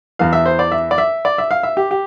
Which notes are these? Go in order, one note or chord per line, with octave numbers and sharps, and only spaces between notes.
E2 E3 F5
E5
C5
D5
E5
D5
E5
D5
E5
F5
E5
G4
G4